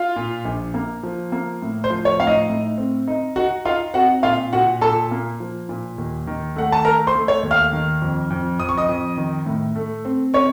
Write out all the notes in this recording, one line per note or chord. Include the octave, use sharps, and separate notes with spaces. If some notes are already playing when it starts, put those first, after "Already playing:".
Already playing: F4 F5
A#2
A#1
A#3
F3
A#3
A2
C5
F3
C#5
A2 F5
D#4 D#5
A2
C4
D#4
D#4 F#4 F#5
D#4 F4 F5
C4 F#4 F#5
A#2 F4 F5
A#2 F#4 F#5
A#2 A4 A5
A#3
F3
A#2
D#2
D#3
A3 F#5
A5
A3 A#4 A#5
C5 C6
A3
C#5 C#6
D#2
F5 F6
D#3
F2
F2
F2 D#6
C#6
D#5 D#6
F2
D#3
A2
A3
C4
C4 C#5 C#6